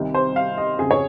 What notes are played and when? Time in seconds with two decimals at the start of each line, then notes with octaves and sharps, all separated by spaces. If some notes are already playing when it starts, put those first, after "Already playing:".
Already playing: C2 C3 D#3
0.14 C5
0.36 F5
0.58 D#5
0.79 F2 C#3 G#4
0.91 C#5